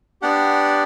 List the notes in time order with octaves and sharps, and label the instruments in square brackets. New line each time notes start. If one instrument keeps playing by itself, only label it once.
[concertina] B3 D4 G4 D5 F#5